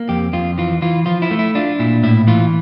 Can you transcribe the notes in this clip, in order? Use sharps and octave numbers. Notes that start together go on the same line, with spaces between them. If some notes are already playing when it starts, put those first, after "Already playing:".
Already playing: A#3
F2 G4
F2 F4
E3 F4
E3 F4
F3 F4
E4
A3
E4
D4 F4
A#2 E4
A2 E4
E3 F4